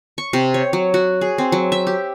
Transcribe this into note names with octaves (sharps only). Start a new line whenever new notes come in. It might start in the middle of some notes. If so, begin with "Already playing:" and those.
C#6
C3
C#5
F#3
F#4
G#4
C4
F#3
E5
G4